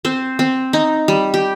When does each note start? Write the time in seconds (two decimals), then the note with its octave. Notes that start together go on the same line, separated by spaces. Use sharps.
0.05 C4 C5
0.39 C4
0.73 D#4
1.08 G3
1.34 G4